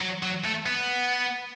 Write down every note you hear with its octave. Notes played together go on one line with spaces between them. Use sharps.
F#3
F#3
A3
B3